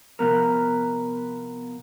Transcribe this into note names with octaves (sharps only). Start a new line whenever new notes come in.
C3 F3 B3 A#4